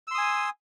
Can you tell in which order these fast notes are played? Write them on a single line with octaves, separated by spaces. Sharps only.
E6 C6 D#6 G#5